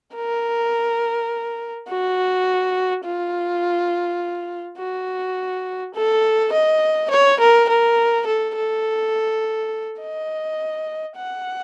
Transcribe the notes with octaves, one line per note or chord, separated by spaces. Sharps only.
A#4
F#4
F4
F#4
A4
D#5
C#5
A#4
A#4
A4
A4
D#5
F#5